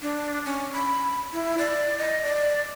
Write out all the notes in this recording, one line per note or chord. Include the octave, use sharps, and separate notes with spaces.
D4
C#4
B5
E4
D5
D#5
D5